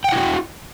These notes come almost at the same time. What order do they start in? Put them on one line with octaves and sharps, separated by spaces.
G5 F#5 E4 F#4